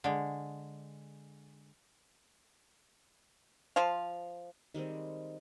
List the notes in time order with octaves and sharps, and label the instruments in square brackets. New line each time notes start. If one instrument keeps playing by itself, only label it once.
[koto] D3 G#3
[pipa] F3 C5 F5
[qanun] D#3 G3 G#3 C4